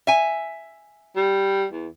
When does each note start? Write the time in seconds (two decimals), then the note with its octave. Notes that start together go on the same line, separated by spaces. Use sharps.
0.07 E5 G#5
1.16 G3
1.72 E2